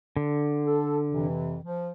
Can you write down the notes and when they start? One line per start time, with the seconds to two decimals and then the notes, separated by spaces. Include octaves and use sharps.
0.17 D3
0.66 A4
1.09 F2 C3 E3
1.64 F3